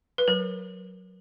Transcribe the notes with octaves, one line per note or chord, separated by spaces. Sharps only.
B4
F#3 A#4